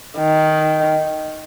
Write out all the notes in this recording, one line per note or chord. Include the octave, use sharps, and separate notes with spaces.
D#3